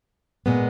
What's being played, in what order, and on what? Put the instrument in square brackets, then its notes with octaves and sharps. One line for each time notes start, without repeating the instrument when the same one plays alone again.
[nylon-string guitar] A#2 G#3 B3